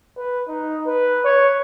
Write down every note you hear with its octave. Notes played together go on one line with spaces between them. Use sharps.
B4
D#4
B4
C#5